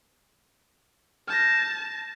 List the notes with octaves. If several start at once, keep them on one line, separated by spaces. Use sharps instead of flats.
A5 F6 G6 A#6